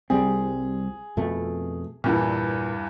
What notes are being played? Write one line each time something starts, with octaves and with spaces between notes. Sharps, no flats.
C2 G3 C4 G#4
F2 B2 A3
E2 G2 A#2 E3